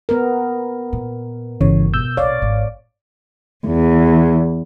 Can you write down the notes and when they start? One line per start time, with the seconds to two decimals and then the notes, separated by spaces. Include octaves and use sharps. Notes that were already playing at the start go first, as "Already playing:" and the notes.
0.09 B3 A#4
0.93 A#2
1.61 G1 C#3 E3 C#5
1.94 B2 E6 G6
2.17 A#1 B2 C#5 D5 F5
2.42 G#1
3.67 E2